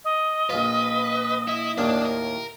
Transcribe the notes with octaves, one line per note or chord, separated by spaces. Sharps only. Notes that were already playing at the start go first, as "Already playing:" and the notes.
D#5
A#1 F4 B4
E4
D#2 A2 A#3 D4
A#4